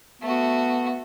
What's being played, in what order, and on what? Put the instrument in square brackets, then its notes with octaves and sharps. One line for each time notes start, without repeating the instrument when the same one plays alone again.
[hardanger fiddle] A3 F#4 [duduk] B3